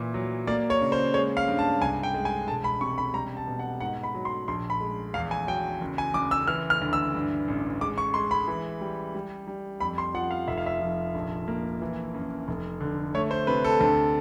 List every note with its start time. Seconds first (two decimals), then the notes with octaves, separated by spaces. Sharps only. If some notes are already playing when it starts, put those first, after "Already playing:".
Already playing: A#2 E3
0.14 F#3
0.47 A#3 D5
0.70 C#5
0.82 C#3
0.92 C5
1.14 G#3 C#5
1.37 F5
1.48 G2
1.59 A5
1.81 C2 G#5
2.03 G5
2.14 G#3
2.25 G#5
2.48 E1 A5
2.64 B5
2.81 C3 C#6
2.98 B5
3.14 G3 A#5
3.37 A5
3.47 B2
3.59 F#5
3.80 G#2 F#5
4.03 B5
4.15 F#3
4.25 C6
4.48 A#1 C6
4.70 B5
4.80 G#3
5.14 E2 F5
5.31 G#5
5.47 F#3 G5
5.81 F#1
5.98 G#5
6.14 F#1 D6
6.31 E6
6.47 E3 F6
6.70 F6
6.82 D2
6.93 E6
7.14 G2
7.48 A1
7.81 G#3 D6
7.98 C#6
8.14 G#3 C6
8.31 B5
8.48 E3
8.81 G3
9.15 G3
9.47 G3
9.80 F2 B5
9.98 C6
10.14 F3 F#5
10.31 F5
10.48 F1 E5
10.58 F5
10.66 E5
10.81 F3
11.15 A#1
11.48 A#3
11.82 E3
12.14 F#2
12.48 F1
12.81 D3
13.14 A3 C#5
13.31 C5
13.47 C3 B4
13.64 A4
13.81 D2 A4